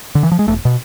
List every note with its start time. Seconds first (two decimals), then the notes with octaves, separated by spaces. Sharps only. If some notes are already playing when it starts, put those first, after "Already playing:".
0.15 D3
0.23 E3
0.32 F3
0.39 G#3
0.47 E1 A3
0.65 B2